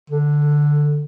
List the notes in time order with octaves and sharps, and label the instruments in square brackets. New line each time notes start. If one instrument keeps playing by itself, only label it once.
[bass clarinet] D3